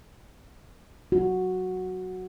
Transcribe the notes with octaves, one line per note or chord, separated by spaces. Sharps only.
F#4